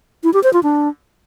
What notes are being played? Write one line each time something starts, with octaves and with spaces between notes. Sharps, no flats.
E4
G4
C5
F4
D4